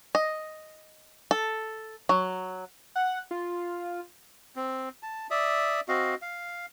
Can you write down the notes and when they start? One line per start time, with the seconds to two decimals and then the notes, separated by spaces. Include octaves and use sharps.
0.15 D#5
1.31 A4
2.09 F#3
2.96 F#5
3.31 F4
4.56 C4
5.03 A5
5.31 D5 E5 D#6
5.88 C4 F#4 D#5 F5
6.22 F5